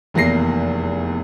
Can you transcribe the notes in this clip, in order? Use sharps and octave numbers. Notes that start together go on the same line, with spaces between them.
F1 E2 A#3 A#6 C7